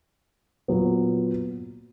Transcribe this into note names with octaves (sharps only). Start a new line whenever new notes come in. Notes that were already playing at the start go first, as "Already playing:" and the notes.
A#2 F#3 B3